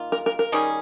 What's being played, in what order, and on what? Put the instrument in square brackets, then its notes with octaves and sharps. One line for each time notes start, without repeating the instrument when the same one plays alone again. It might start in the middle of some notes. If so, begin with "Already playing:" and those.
Already playing: [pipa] D#3 A#3 F4
[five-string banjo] A#4
A#4
A#4
[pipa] D#3 G3 C#4 G#4